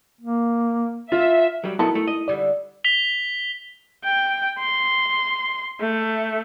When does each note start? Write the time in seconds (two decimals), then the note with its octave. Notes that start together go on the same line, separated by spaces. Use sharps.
0.21 A#3
1.12 F4 E5
1.64 F#3 G3
1.79 D#3 F#3 G#3 B3 E4 A4
1.95 A3
2.08 D#5
2.28 D3 G3 E4 D5
2.84 B6 F7 G7
4.05 G5
4.59 C6
5.80 A3